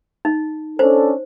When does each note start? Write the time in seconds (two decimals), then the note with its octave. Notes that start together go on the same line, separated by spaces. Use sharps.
0.25 D#4
0.79 C#4 D4 A4 C5